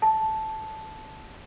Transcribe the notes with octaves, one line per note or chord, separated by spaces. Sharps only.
A5